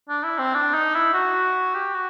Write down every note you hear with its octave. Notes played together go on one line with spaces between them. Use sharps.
D4
E4
C4
D4
D#4
E4
F#4
G4
F#4